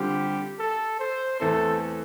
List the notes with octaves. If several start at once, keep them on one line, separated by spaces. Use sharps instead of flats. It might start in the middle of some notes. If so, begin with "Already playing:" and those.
Already playing: D3 G3 C4 F4 G4
A4
C5
E2 E3 A3 C4 A4